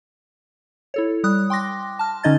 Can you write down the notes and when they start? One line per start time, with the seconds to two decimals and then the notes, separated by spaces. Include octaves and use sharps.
0.94 E4 A4 C#5
1.24 G3 D#6 F#6
1.50 G5 C6 D6 A#6
1.99 A5 F6
2.23 D3 C#4 D#4 D#5 G#6 A6